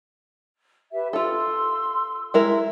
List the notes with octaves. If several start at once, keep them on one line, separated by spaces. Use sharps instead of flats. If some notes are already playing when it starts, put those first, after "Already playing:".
G4 B4 E5
F4 A4 C6 E6
G#3 E4 A#4